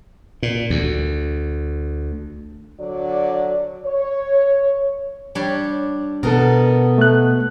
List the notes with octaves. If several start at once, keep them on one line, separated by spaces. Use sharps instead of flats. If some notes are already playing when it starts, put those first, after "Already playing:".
A#2
D2
D3 F#3 D5
C#5
G3 D4 C#5
B2 B3 A4 A#4 D#5
A3 F#6